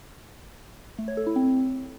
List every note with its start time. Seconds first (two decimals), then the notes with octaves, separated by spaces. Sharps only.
0.99 A3
1.08 C#5
1.17 A4
1.26 E4
1.36 C4